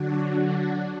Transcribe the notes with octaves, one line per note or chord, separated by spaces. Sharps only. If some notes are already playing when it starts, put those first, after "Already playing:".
Already playing: D3 F#3 D4 F#4
D4